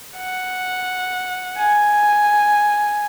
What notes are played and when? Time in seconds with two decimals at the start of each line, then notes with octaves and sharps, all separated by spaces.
0.17 F#5
1.58 G#5